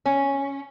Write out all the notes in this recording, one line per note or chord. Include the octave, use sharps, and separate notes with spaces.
C#4